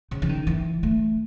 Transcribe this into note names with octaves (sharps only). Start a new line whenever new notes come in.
C#3
E3
D#3
E3
A3